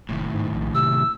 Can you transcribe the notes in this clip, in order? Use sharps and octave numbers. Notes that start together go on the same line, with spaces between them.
F1 D#2 A2
G#2
A#1
C3 E6